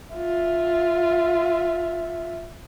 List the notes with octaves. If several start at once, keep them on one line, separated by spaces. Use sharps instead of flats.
F4 E5